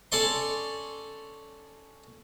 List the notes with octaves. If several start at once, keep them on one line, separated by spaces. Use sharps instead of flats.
C#4 A4 C#5 D5 C6